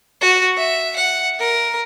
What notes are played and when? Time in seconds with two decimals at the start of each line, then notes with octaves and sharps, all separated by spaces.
0.21 F#4
0.57 E5
0.96 F#5
1.40 A#4